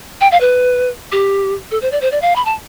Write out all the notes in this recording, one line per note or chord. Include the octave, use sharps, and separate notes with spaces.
G5
F5
B4
G4
A4
C5
D5
C5
D5
F5
B5
A5